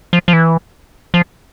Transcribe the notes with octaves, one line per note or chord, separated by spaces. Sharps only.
F3
F3
E3
F3